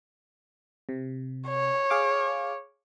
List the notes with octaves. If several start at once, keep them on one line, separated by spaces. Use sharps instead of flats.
C3
C#5
G#4 F5 D6